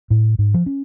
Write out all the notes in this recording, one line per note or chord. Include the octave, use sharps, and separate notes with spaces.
A2
G#2
F3
C#4